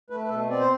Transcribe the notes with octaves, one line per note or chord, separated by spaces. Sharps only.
A3 B4
B4
B2 A4
C4 D5
C5